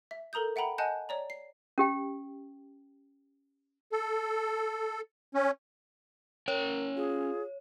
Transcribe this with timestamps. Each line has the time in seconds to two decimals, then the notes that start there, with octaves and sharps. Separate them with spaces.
0.11 E5
0.33 A4 A#4 A#5 D#6 G6
0.56 E5 F#5 G5 A#5 B5
0.78 D#5 F#5 G#5 A5 F#6 G6
1.09 C#5 D5 A#5
1.30 C7
1.78 C#4 G4 G5
3.92 A4
5.34 C#4
6.48 C#4 A#4 C#5 G5
6.97 F4 G#4